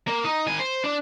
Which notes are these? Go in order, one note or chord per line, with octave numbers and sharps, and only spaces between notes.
A#3
D#4
D#3 G#5
C5
D4